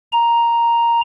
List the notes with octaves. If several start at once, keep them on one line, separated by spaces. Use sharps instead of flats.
A#5